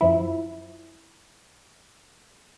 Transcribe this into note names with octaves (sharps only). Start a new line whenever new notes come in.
F#2 F3 E4